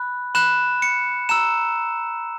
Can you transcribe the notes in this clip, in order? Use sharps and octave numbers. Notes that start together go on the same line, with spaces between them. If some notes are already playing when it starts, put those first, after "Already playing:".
Already playing: B5 F#6
B5 F#6 E7
C#7
A#5 E6 E7